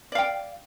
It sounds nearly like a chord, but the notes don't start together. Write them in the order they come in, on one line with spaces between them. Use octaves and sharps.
D5 F5 G5